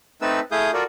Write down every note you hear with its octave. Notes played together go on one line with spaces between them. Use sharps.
A3 C4 D#4 A4 B4 E6
A3 E4 G#4 F5 D#6 G6
F4 F#4 A4 A#4 D5